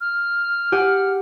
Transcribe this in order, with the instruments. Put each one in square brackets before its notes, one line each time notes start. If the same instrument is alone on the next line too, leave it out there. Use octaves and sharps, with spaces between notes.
[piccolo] F6
[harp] G4 G#4 F#5